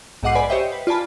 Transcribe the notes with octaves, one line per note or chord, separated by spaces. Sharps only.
B1 G#2 D#5 F#5 D6 C7
B4 D5 G#5 B5
G4 C5 C#5 D#5 E5 G5
B4
F4 D5 G#5 A5 B5